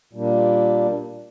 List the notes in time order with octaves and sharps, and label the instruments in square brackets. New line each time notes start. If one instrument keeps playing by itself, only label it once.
[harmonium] A#2 G3 A#3 D4